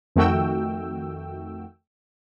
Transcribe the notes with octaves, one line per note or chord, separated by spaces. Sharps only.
F2 D#3 A3 F#4 G5 E6